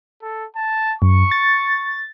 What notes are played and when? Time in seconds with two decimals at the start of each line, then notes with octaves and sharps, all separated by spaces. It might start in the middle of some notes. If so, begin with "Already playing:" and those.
0.22 A4
0.56 A5
1.02 F#2 C#6
1.31 A6